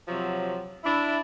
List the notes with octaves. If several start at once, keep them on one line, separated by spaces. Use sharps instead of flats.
C3 F3 F#3
D4 E4